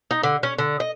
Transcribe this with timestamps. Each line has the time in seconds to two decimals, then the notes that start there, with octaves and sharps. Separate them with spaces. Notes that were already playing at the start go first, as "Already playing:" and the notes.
0.11 D#4
0.23 D3
0.43 C#4
0.59 D3
0.80 D#5